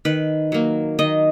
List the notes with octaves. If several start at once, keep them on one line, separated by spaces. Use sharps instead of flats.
D#3 B4
F#3 A#3
D#3 D#5